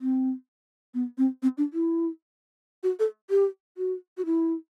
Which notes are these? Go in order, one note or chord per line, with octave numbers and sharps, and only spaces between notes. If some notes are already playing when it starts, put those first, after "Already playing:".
C4
B3
C4
C4
D4
E4
F#4
A4
G4
F#4
F#4
E4